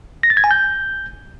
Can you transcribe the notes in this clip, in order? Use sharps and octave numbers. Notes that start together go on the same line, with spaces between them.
A#6
A6
G#6
G#5
G6